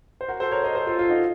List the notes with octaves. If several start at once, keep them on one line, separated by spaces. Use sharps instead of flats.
C5
F#4 A#4
A4 C5
A#4 C#5
C5 D#5
A4 C5
F4 A4
F4 A4
D#4 F#4